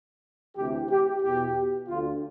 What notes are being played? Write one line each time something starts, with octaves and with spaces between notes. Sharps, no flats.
D2 C3 E3 G4
G4
E2 B2 G4
D2 D3 F4